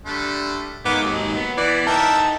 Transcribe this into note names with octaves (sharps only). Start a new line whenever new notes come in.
D3 G3 A3
G#2 D#3 A#3 B3 G#4 D6
D#2 F#3
B3
E3 D5
D#4 A4 A#4 E5 G5 A5